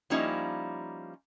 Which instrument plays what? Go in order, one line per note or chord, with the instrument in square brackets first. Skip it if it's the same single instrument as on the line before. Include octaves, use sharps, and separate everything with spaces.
[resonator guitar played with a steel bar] F3 G3 A#3 C#4 D#4 E4